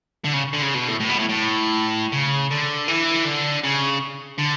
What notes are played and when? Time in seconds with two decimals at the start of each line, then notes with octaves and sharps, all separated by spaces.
0.24 D3
0.34 C#3
0.53 D3
0.62 C#3
0.74 B2
0.88 A2
1.00 A2
1.09 B2
1.19 A2
1.29 A2
2.12 C#3
2.51 D3
2.88 E3
3.25 D3
3.63 C#3
4.38 D3